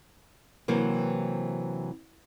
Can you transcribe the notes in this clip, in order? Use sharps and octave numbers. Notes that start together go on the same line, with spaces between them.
C3 E3 F#3 A#3 C4